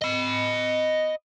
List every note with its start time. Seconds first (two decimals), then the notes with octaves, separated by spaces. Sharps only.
0.02 D#5 B5